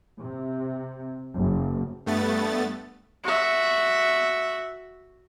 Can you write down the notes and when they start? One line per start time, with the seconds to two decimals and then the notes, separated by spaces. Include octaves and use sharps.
0.20 C3
1.36 F#1
2.06 G2 A3 B3 A6
3.24 F#4 E5